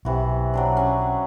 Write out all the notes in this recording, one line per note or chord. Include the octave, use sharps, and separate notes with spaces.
B1 C3 E3 F#4
F#3 C4 D4
C#4 F#5